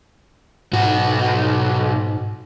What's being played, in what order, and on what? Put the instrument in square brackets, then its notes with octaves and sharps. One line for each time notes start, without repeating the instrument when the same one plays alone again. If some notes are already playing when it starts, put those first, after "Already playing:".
[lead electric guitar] B1 F#4 [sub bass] G#2